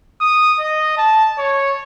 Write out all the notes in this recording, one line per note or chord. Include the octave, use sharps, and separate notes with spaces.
D#6
D#5
A5
C#5